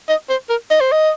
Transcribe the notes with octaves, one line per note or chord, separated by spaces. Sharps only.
D#5
C5
A#4
D#5
C5
D#5